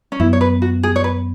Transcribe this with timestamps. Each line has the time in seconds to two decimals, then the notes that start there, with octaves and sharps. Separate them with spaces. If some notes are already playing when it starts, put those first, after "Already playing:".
0.12 C#4
0.20 F#2 F#3 B3 E4
0.33 C#5
0.41 B4
0.62 F#4
0.83 G#4
0.96 C#5
1.04 B4